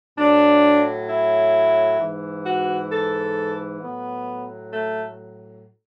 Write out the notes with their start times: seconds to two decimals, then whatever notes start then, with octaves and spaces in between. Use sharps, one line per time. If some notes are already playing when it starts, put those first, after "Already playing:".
0.18 A2 F#3 D4
1.08 E4
2.00 G#2 E3
2.45 F#4
2.91 A4
3.81 A2 F#3 B3
4.73 A3